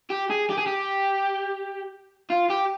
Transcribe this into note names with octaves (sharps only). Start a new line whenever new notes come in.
G4
G#4
G4
G#4
G4
F4
G4